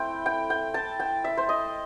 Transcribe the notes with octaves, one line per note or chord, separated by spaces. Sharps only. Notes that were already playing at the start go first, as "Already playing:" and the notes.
Already playing: A3 C4 E4 G5
G5
G5
A5
G5
E5
C5
D#5